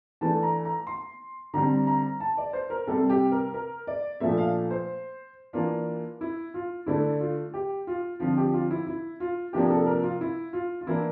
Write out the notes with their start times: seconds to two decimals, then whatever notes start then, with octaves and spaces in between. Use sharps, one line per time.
0.21 E3 A3 D4 A5
0.43 A#5
0.65 A#5
0.87 C6
1.54 D3 G3 C4 A#5
1.87 A#5
2.20 A5
2.37 D5
2.53 C5
2.70 A#4
2.87 C3 G3 C4 A4
3.10 G4
3.31 A#4
3.54 A#4
3.87 D5
4.20 A#2 F3 A3 D4 E5
4.37 F5
4.71 C5
5.53 E3 A#3 D4 F4
6.21 E4
6.54 F4
6.86 D3 A3 D4 E4
7.20 F4
7.54 G4
7.87 F4
8.20 D3 F3 C4 F4
8.37 G4
8.53 F4
8.71 E4
8.87 E4
9.20 F4
9.53 C3 F3 A#3 D4 G4
9.70 A4
9.86 A#4
10.03 F4
10.21 E4
10.53 F4
10.81 F4
10.87 E3 A#3 D4 E4